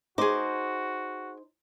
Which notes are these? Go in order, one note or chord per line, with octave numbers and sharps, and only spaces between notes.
D#4 F#4 G#4 C5 D6